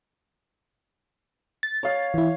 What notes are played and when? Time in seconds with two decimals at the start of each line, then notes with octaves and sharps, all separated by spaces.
1.63 A6
1.83 C#5 F5
2.14 E3 E4